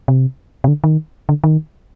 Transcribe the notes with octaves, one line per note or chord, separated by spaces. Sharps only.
C3
C3
D3
D#3
D3
D#3